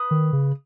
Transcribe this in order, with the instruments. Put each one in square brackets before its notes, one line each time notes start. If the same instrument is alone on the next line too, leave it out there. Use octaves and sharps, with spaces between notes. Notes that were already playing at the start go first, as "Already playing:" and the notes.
Already playing: [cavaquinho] B4 D#6
[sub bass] D#3
C#3